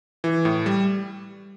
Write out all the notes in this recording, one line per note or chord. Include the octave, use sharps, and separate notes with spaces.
E3
A2
G3